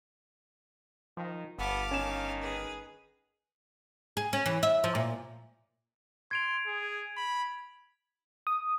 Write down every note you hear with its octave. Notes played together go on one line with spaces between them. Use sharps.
D#3 F3
G1 B3 F5 A5 D6
D#3 C#4 E7
G#4 B4
G#4
C#4
E3
E5
F3
A#2
C6 G#6 D7 F7
G#4
B5
D#6